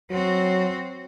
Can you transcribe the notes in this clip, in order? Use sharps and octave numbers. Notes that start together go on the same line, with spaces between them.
F#3 C4 F#4